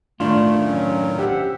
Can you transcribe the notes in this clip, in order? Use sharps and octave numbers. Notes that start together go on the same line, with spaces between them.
A2 D#3 A3 D4 F4
F#3 C#4
G4 C5 E5 F#5